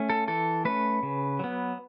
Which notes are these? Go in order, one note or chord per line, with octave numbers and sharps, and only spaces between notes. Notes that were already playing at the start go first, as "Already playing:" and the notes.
Already playing: A3 C#4
A4
E3 A4
A3 C#4 B4
C#3
F#3 B3